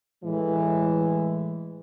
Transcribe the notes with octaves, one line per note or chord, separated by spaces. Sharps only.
A2 E3 G#3